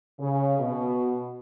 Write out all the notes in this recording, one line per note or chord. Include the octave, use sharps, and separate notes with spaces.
C#3
B2